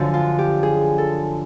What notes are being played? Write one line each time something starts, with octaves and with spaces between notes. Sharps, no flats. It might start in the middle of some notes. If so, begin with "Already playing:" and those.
Already playing: F#2 D3 F3
F4
G4
G#4
A4